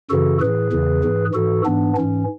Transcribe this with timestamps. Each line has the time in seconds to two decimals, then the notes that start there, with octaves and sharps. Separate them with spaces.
0.10 F#2 C#3 E3 F#4 A4
0.41 A2 E3 G#4 B4
0.72 E2 C#3 E3
1.03 G#2 E3
1.34 G#2 E3 F#4 A4
1.65 G#2 E3 B3 D4
1.96 G#2 E3 C#4